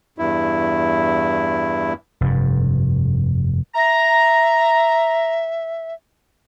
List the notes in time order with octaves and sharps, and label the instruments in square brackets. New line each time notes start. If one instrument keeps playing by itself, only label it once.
[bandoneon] E2 G2 E4
[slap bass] F1 G2
[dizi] E5 [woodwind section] A#5